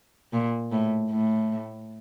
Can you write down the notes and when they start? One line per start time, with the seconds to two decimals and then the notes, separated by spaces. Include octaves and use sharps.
0.32 A#2
0.72 A2
1.10 A2